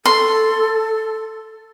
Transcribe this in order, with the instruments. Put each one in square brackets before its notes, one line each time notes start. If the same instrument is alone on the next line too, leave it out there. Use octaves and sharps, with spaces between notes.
[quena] A4 [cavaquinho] C6